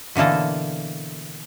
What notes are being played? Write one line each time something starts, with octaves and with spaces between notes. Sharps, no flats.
B2 D3 E3 A#3 A4